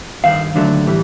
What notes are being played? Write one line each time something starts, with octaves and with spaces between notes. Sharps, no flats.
G2 D#3 F5
D#2 D3 F#3 A3
A2 E3 G3